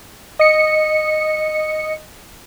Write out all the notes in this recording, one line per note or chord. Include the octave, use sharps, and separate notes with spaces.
D#5 C#7